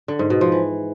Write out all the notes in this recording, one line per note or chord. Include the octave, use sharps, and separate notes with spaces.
D3
G#2
B2
F3
E3